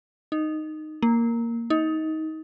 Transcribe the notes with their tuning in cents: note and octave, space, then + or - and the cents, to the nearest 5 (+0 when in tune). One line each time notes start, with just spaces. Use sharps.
D#4 -10
A#3 -5
D#4 +20